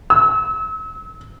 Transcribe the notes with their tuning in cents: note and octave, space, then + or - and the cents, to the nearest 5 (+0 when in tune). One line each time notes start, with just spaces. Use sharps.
E6 -35